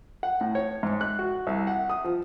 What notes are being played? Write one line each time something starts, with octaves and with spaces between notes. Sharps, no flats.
F#5
A2
C#5
G#2
F#6
F#4
C2
F#5
D#6
F3